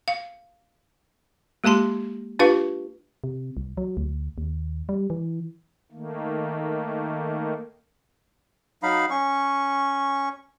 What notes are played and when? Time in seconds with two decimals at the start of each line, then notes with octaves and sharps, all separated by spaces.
0.08 F5
1.64 G#3 A#3 G4 A5 C6
2.39 D4 F4 G4 B4 F5 C#6
3.24 C3
3.57 C2
3.77 F#3
3.97 D2
4.38 D#2
4.89 G3
5.10 E3
5.92 D#3 A3 A#3
8.83 F#3 D#4 F5 B5
9.11 C#4 C#6